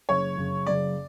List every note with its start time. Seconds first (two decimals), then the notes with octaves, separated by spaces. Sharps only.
0.09 F#1 F#2 C#3 C#5
0.38 F#1 F#2 C#3
0.66 F#1 F#2 C#3 D5